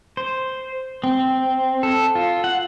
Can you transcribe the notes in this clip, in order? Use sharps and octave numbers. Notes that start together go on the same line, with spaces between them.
C5
C4
A4
F4
F#5